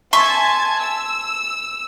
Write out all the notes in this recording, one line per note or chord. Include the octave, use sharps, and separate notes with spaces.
E5 G#5 A5 C6 C#6 G#6
E6